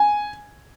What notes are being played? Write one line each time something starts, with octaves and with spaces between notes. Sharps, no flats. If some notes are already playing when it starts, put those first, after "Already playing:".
Already playing: G#5